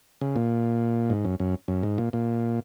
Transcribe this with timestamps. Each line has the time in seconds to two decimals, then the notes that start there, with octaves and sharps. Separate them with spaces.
0.21 C#3
0.36 A#2
1.10 G#2
1.25 F#2
1.40 F#2
1.68 F#2
1.83 G#2
1.98 A#2
2.13 A#2